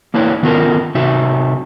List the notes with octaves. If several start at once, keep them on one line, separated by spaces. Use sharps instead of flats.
A#3 D4 E4 B4 C#5
D#3 B3 C#4 F4 A#4
C3 D#4 F#4 E5